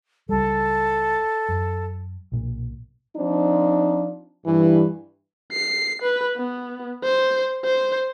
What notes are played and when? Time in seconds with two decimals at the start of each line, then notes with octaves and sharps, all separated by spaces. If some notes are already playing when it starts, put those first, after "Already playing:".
0.29 C#2 G3 A4
1.49 F#2
2.32 B1 A#2
3.16 F3 C4 D4 D#4
4.46 G2 E3
5.52 C7
6.02 B4
6.37 B3
7.03 C5
7.64 C5